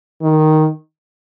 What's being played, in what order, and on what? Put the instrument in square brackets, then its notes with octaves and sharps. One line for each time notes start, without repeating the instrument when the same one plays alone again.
[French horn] D#3